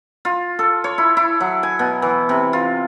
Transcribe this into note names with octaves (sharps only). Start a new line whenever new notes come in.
F4
A4
C#5
E4
E4
F#3
G#5
B2
E3
C3
F4